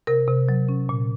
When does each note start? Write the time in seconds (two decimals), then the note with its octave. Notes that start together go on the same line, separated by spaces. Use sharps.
0.07 C3 A#4
0.28 C3
0.49 F#3
0.69 C#4
0.89 A#2